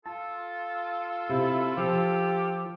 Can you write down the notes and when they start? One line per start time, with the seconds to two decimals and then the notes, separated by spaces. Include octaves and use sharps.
0.06 F4 A4 A5
1.30 C3 E4
1.78 F3 G4